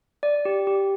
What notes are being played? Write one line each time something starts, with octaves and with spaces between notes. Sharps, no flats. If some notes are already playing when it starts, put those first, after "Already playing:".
D5
G4
G4